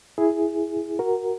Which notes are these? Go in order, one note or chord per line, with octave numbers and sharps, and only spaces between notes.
E4 G#4
F#4 A#4